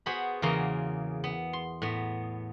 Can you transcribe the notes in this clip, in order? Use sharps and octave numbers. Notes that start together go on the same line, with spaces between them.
B3 F#4 G#4 C5 B5
E2 C#3 A#3 A#5 C6
B3
C6
A2 B3